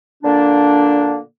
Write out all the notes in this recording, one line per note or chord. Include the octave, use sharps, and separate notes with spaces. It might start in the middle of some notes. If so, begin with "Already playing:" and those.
A#2 D3 A#3 D4